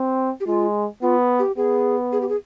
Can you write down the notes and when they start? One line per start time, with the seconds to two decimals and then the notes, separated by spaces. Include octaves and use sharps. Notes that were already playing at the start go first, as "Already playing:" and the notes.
Already playing: C4
0.40 G4
0.47 G#3 F4
1.02 B3 F4
1.39 G4
1.57 B3 G#4
2.12 G#4
2.21 G4
2.29 G#4